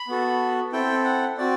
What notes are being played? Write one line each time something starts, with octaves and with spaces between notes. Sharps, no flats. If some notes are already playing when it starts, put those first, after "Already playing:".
Already playing: B5
B3 F#4 A4
C4 E4 A4 G5
F#5
C4 F#4 D5